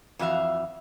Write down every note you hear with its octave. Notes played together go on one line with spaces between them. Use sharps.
F2 E3 F#4 E5 F5